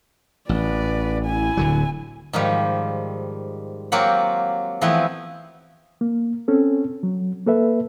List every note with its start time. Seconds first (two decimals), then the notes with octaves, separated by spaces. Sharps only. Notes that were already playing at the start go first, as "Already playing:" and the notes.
0.49 A1 B4 D5
1.26 E4 G#5
1.57 D1 D3 F#3
2.33 G#2 D#3 F3 G3
3.92 F#3 A#3 C4 F4 G4 F#5
4.81 E3 F3 A3 B3 C4 E4
6.01 A#3
6.48 C4 C#4 A4
7.03 F#3
7.47 A#3 A4 B4 E5